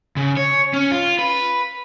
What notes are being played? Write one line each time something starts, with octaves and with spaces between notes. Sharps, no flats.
C#3
C#5
C#4
F4
B4